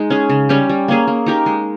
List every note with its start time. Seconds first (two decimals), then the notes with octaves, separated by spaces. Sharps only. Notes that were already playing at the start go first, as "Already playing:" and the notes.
Already playing: G#3 D#4
0.10 C#4 G#4
0.30 C#3
0.49 G3 C#4 G4
0.69 G3
0.88 A#3 C#4 G#4
1.07 A#3
1.26 D#4 G4 A#4
1.46 G#3